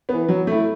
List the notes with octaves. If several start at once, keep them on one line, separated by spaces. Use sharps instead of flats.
E3 B3
F#3
A3 E4